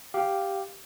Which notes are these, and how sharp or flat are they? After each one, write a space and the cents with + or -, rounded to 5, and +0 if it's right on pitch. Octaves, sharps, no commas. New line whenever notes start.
G4 +0 F5 +0